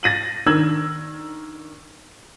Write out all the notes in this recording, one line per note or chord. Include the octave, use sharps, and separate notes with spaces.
A6 A#6 D#7 F#7
D#3 D4 A#4 E6 G#6 F#7